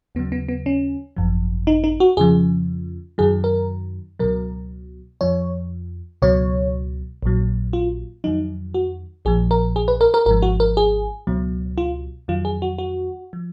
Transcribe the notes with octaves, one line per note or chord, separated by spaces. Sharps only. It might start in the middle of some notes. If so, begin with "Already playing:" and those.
D#2 C#3 F#3 B3
B3
B3
C#4
G#1 F#2 F3
D#4
D#4
F#4
F2 C#3 F3 G#4
F#2 D#3 F#3 G#4
A#4
C#2 B2 F#3 A#4
F2 F3 C#5
C#2 B2 F#3 C#5
A#1 A#2 F#3
F4
F2 D#3 F#3 D#4
F#4
A#1 A#2 F3 G#4
A#4
G#4
B4
A#4
A#4
G#1 G#2 F3 A#4
F#4
A#4
G#4
C#2 B2 F#3
F4
F2 D#3 F#3 F4
G#4
F#4
F#4
F3